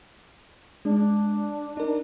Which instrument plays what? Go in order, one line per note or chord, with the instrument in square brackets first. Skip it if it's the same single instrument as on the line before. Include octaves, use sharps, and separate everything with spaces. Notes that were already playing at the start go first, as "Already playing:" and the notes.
[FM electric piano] G#3 [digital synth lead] D4
[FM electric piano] D#4 A#4